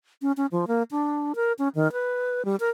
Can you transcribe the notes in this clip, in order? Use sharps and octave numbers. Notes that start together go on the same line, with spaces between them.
C#4
C#4
F3
A#3
D4
A#4
C#4
D#3
B4
G3
A#4